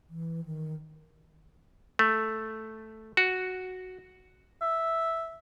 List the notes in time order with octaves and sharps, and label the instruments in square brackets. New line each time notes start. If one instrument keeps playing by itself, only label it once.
[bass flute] E3
D#3
[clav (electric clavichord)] A3
F#4
[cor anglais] E5